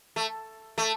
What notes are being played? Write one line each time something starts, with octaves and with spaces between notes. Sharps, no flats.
A3
A3